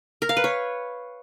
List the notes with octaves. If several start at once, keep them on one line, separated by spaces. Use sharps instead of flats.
A#4
F5
B4
C#5